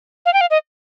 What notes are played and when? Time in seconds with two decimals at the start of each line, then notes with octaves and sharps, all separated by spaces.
0.26 F5
0.33 G5
0.41 F5
0.50 D#5